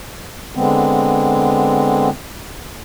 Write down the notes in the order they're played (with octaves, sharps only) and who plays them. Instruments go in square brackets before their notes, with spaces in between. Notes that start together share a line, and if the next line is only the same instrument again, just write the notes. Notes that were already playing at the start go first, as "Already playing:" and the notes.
[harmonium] D3 G#3 B3 C4